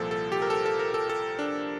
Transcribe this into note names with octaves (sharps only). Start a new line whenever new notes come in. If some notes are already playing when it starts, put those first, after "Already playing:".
Already playing: C2 A#2 F3 A4
A4
G4
A#4
A4
A4
A#4
A4
A4
D4